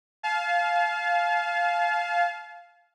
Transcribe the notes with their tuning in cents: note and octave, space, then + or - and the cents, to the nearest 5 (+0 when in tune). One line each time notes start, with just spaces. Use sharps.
F5 +0 A5 -40